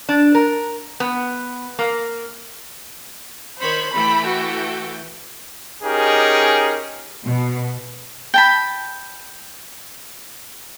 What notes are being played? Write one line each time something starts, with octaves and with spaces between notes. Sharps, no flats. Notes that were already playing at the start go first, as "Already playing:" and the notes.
D4
A#4
B3
A#3
D#3 C5 C#5 B5
E3 A3 G5 B5
F#4
C#4 D#4 G4 G#4 A#4
B2
G5 A5 B5